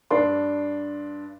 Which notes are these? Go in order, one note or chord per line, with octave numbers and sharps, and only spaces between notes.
G2 D4 C6